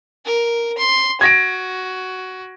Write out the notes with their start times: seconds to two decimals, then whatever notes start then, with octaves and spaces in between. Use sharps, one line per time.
0.25 A#4
0.78 C6
1.21 F#4 G#6 A#6 D7